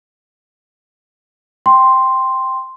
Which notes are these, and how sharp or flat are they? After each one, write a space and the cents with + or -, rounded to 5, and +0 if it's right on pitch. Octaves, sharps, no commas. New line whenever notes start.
G5 +0 C6 +0